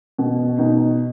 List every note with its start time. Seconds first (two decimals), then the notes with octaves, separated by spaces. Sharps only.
0.18 B2
0.58 B2 D#4